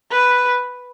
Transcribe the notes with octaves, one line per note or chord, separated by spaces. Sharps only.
B4